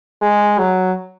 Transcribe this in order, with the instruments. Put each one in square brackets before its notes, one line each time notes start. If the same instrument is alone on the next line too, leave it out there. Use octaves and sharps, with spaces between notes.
[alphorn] G#3
F#3